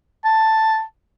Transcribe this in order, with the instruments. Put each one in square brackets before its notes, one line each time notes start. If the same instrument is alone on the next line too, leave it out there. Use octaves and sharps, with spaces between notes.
[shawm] A5